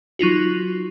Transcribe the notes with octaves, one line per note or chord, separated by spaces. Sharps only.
F#3 D#4 F4 F#4